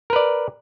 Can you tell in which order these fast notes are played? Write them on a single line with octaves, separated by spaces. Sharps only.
A#4 B4 D5